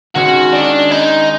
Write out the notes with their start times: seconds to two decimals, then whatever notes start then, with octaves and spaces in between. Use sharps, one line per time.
0.15 D#3 G#3 C#4 F#4
0.53 D4
0.91 D#4